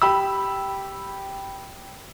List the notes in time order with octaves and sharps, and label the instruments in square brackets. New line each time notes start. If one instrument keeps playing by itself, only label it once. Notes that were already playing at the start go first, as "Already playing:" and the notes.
[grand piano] G4 B5 E6